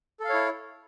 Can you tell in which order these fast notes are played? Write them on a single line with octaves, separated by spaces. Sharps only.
A4 F5 C#5 E4